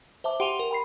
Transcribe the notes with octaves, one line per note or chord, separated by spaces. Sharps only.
C5 E5 A5 D6
G4 F#5 G5 C6 D#7 F7
A#4
G5 B5 C7